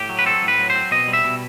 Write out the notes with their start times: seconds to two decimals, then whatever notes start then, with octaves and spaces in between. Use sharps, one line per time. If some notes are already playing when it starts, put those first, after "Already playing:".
Already playing: A2 G4
0.09 F#3
0.19 B4
0.26 C4 A4
0.43 A2
0.48 B4
0.59 F#3
0.70 C5
0.75 C4
0.91 B2 D#5
1.08 G3
1.13 E5
1.24 B2